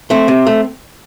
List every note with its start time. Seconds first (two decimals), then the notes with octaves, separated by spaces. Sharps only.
0.10 A3 C4
0.28 C3
0.47 A3